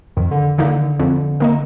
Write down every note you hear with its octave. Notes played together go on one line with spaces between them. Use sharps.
F2 D#3
D3
D3 D#3 A#3 D#4
F2
D#3 A#3 D#4